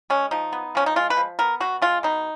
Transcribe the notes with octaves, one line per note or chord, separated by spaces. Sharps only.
G#3 C#4
F3 D#4
B3
F3 C#4
D#4
G#3 F4
B4
F3
B3 A#4
B2 F#4
G#3 F4
B2 D#4